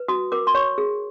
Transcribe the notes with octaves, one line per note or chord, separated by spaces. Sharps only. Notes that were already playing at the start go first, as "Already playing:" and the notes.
Already playing: B4
F#4 D#6
A#4 D6
C6
C#5 C#6
G#4